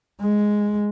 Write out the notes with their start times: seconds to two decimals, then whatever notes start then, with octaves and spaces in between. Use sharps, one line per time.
0.22 G#3